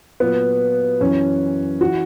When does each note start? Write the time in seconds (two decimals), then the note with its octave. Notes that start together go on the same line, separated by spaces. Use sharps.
0.20 A#2 F#3 B3
1.01 F#2 E3 C#4
1.81 E3 F#4